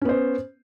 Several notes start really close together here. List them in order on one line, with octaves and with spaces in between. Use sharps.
C#4 B3 C5